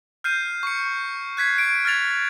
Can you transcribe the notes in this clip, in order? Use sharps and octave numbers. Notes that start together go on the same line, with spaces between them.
F6 G6 C7 D#7
C#6 C#7
F#6 G#6 B6 C7
D7
F6 G#6 A6 F7